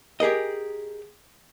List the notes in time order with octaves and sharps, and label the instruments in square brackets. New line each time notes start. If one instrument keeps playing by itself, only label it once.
[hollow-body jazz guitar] G4 G#4 A#4 D#5